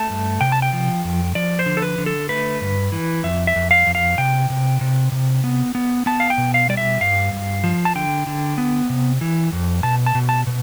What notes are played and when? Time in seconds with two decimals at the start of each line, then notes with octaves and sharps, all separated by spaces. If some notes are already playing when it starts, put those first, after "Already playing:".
Already playing: A3 A5
0.10 G2
0.41 C3 G5
0.52 A5
0.62 G5
0.73 F3
1.05 F2
1.35 F3 D5
1.59 C5
1.66 D3
1.77 A4
1.82 B4
1.98 D3
2.06 A4
2.29 A3 B4
2.61 G2
2.92 E3
3.23 F2 E5
3.47 E5
3.56 F2
3.71 F5
3.87 F2
3.95 F5
4.18 C3 G5
4.50 C3
4.81 C3
5.12 C3
5.44 B3
5.75 B3
6.06 B3 A5
6.20 F5
6.30 G5
6.38 B2
6.54 F5
6.69 G3 D5
6.77 E5
7.01 G2 F5
7.33 G2
7.64 F3
7.85 A5
7.95 D3 G5
8.27 D3
8.58 B3
8.90 C3
9.21 E3
9.52 F2
9.83 B2 A5
10.06 A5
10.15 B2
10.29 A5
10.47 B2